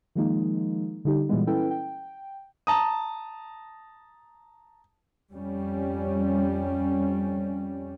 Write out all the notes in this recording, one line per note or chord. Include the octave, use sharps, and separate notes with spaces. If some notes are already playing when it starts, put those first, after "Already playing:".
D#3 F3 G#3 A#3 D#4
D3 G3 D#4 G4
A#2 E3 G3 G#3 B3
C#4 E4 A4 B4 G5
G5
A5 A#5 D#6
F2 G3 C#4